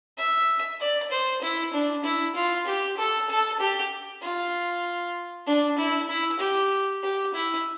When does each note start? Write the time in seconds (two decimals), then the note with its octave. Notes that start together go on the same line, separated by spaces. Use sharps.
0.18 E5
0.80 D5
1.11 C5
1.42 E4
1.73 D4
2.04 E4
2.35 F4
2.67 G4
2.97 A4
3.29 A4
3.60 G4
4.22 F4
5.47 D4
5.78 E4
6.09 E4
6.40 G4
7.03 G4
7.34 E4